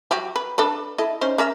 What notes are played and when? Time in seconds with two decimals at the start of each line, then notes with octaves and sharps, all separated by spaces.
0.11 F#3 F#4 G4
0.36 B4
0.58 D4 A4 B4
0.98 E4 A4 D#5
1.21 C#4 D#4 C5
1.38 C#4 A#4 E5